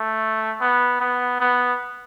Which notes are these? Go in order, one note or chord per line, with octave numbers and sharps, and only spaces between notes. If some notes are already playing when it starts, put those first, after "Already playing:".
Already playing: A3
B3
B3
B3